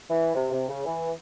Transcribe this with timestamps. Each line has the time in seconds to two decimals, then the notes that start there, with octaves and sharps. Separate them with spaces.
0.10 E3
0.35 C3
0.52 C3
0.68 C#3
0.85 E3